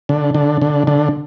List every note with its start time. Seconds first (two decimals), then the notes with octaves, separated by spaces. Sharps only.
0.09 D3
0.34 D3
0.61 D3
0.87 D3